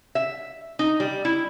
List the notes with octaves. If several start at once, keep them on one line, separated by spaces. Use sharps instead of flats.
E5
D#4
G3
E4